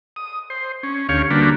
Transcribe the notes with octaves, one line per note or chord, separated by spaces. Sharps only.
D#6
C5
C#4
D2 C#4 G4 C#5 F5
D3 G3 A#3 D4 F#4 B4